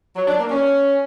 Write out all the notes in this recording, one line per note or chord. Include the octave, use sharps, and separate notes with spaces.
F#3
D4
A#3
C#4